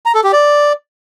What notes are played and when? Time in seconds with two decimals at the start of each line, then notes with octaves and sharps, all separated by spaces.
0.06 A#5
0.15 A4
0.24 G4
0.33 D5